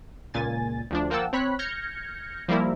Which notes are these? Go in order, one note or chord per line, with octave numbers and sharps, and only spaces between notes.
C#2 A#2 G#5 A6
D2 F3 D4
F3 A#3 F#5 G5 A5 E6
C4 C#5 B5 F#6 B6
F6 G6 G#6 A#6 C#7
F3 G3 A#3 E4 A#4